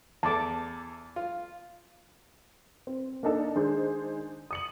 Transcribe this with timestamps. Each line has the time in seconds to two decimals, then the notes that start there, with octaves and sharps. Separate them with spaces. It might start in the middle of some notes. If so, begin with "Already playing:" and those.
0.23 E2 A4 A5 D6
1.16 F4
2.87 C4
3.23 A#3 D4 D#4 A4 D5
3.55 D#3 G#3 D4 G#4 C5
4.51 D#6 C#7 F#7